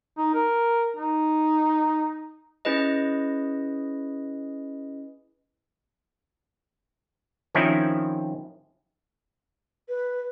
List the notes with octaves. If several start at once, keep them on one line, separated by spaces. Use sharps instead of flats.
D#4
A#4
D#4
C#4 E4 G#4 B4 D#5
D#3 F3 C4 C#4 D#4 E4
B4